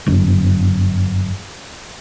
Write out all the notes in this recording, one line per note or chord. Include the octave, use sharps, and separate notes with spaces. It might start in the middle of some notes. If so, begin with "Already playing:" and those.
G1 F#2